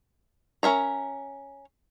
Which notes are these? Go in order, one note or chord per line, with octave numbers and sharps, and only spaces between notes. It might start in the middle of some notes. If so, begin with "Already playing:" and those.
C#4 A#4 E5 A#5